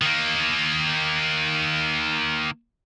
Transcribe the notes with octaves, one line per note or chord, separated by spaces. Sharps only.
D#3 A#3